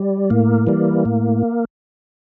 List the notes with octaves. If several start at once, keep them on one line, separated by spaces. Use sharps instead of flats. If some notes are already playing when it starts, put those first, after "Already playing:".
Already playing: G3
A2 A#3
E3 G3
A2